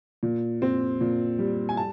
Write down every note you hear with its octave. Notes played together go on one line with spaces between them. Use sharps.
A#2
C4
A#2
G3
G#5
A5